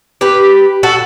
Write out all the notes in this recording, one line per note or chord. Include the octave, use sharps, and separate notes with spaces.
G4 B4
F#4 A4